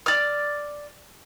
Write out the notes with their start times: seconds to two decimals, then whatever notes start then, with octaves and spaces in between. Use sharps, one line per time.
0.06 D5 F6